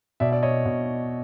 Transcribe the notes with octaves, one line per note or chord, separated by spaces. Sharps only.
B2 D5 E5
D5 E5
C#5 D#5
B2